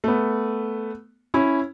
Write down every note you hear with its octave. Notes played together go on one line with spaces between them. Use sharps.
A3 B3
C#4 E4